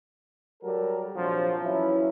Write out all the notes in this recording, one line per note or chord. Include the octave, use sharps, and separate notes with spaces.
F#3 G3 A4 A#4
A#1 C3 F3 F#3 F4
E3 F#3 C#4 E4